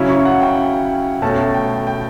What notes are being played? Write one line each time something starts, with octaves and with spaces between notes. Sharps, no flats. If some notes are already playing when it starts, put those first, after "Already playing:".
Already playing: C#3 F#3 C#4 E4
C#6
F#5
G5
B2 A3 C#4 A5
G5
G5